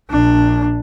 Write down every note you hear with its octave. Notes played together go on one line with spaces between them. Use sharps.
A#1 D4